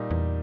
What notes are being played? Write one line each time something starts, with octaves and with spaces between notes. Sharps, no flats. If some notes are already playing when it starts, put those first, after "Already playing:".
Already playing: A#2 G3 A#3 D#4
E2